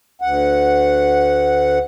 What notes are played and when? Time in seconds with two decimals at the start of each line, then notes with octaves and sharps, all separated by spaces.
0.22 D2 F#5